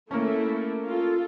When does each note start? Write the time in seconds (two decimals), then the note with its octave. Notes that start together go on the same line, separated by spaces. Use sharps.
0.11 A3 A#3 C#4 E4
0.86 F4 A4